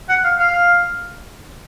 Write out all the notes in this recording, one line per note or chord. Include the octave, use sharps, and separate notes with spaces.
F#5
F5
F5